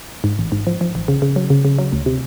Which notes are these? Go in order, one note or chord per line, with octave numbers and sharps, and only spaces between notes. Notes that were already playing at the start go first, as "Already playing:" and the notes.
G#2
A1
G#2
F3
F3
A1
C#3
C#3
F#3
C#3
C#3
F#3
D2
C3